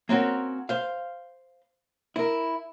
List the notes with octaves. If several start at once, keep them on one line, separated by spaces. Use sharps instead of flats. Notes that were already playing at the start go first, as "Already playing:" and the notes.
A#3 C4 C#4 F#4 A#4
C5 F5
E4 A#4